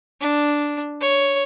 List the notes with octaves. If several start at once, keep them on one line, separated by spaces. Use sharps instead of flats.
D4
C#5